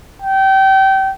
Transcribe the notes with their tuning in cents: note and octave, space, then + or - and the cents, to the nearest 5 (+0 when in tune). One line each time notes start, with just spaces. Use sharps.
G5 -25